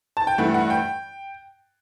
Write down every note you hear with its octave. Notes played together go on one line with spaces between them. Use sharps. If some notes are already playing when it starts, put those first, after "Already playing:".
A5
G5
G2 E3 A3 F#5
F#5
G5